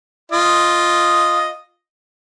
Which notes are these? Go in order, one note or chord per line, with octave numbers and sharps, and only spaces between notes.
F4 D#5